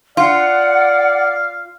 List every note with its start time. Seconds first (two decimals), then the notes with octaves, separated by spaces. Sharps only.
0.17 F4 D5 F5 F#5